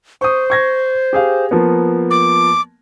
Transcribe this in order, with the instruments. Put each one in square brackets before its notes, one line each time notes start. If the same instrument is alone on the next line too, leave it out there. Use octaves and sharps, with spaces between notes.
[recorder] C5 [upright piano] C#6 D#6
[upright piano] C#6 G#6 A#6
G4 G#4 F5
F3 A#3 B3
[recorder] D6